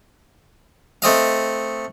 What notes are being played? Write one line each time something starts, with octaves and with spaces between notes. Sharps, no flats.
A3 C4 D#5 F5